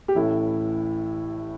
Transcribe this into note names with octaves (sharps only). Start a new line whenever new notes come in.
G4
A1 A2 E3 E4